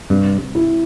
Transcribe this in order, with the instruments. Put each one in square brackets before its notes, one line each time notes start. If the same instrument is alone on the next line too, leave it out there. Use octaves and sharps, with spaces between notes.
[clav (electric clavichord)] G2 [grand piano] C3
[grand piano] E4